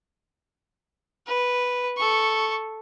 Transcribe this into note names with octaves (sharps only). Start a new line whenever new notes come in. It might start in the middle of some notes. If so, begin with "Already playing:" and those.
B4
A4 C#6